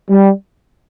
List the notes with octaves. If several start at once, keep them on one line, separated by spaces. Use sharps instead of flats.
G3